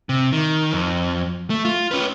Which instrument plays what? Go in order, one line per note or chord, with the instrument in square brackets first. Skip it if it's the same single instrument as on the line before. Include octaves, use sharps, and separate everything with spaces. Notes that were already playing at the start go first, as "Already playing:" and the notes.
[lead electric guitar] C3
D#3
F2
A3
F4
C#4 B4